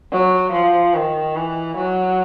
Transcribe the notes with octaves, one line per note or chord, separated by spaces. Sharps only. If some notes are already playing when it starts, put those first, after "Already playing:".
F#3
F3
D#3
E3
F#3